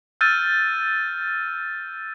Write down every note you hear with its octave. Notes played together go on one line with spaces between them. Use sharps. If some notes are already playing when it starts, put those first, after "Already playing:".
E6 F6 G6 A6 D#7